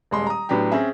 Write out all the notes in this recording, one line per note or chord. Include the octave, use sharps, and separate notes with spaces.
D#1 G#3 C6
A#5 D#6
A2 F#3 B3 D4 G4
C4 C#4 G#4 E5